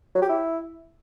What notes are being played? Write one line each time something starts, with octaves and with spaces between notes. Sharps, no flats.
F#3
G4
E4